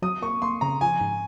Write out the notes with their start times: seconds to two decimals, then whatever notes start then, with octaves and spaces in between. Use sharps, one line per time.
0.02 F#3 D#6
0.22 A#3 C#6
0.42 A#3 C6
0.61 C#3 A#5
0.81 F3 G#5
1.01 G#2